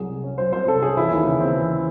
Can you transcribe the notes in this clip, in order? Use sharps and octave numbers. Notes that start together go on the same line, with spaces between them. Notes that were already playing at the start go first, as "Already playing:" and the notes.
Already playing: C2 F#3 G#4
C3
C#4
F#3 C5
C2 C5
C3 A4
C#4 G#4
E3 E4
D#2
C#3
C4
E3